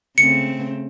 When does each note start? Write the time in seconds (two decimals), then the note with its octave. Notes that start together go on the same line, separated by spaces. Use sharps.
0.18 C#3 A3 C4 C#7